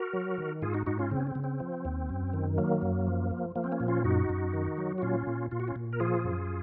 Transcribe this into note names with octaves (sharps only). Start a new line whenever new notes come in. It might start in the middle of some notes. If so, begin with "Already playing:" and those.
Already playing: F#4 A#4
F#3
D#3
G#2 F4 G#4
D#4 F#4
G#2 D#4 F#4
C#4 F4
C#3 C4
C#4
C4
C#3
C4
F3
D#2
F#2
D#3
F#3 A#3
F#2
F3
F3
F3 A#3
C4
A#3 C#4
A#2
C#4 F4
F#2 D#4 F#4
F#2
D#3
F#3
F#4
A#2 C#4 F4
A#2
A#2 F4
F#4
C#4 F4
A#2
A#4
F3 F4 G#4
F#2